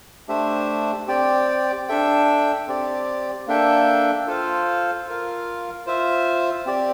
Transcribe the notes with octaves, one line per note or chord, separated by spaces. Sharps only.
A3 D4 G4 C5 E5
C4 G4 D5 G5
D4 A4 E5 G5
C4 G4 D5
A#3 D4 A4 E5 G5
F4 A4 C5 F5
F4 A#4 F5
F4 C5 E5
C4 G4 D5